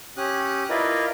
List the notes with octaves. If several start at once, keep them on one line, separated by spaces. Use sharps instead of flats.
C#4 G4 D#6 F#6
E4 F4 A#4 B4 D5 D#5